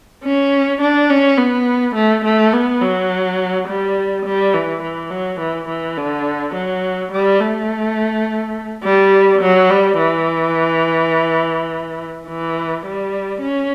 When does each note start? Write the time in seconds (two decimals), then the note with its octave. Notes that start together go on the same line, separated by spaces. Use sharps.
0.24 C#4
0.81 D4
1.09 C#4
1.37 B3
1.95 A3
2.24 A3
2.53 B3
2.82 F#3
3.67 G3
4.25 G3
4.53 E3
4.83 E3
5.10 F#3
5.40 E3
5.68 E3
5.97 D3
6.55 F#3
7.11 G3
7.40 A3
8.84 G3
9.41 F#3
9.70 G3
9.98 E3
12.28 E3
12.85 G3
13.42 C#4